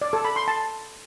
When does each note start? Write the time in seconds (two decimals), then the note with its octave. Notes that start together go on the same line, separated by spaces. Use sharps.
0.02 D5
0.13 A4
0.25 B5
0.36 C6
0.48 A5